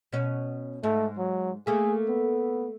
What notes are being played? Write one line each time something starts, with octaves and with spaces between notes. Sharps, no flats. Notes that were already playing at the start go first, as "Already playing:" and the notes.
B2 C#4
G#2 A3
F#3
A3 A#3 G#4
B3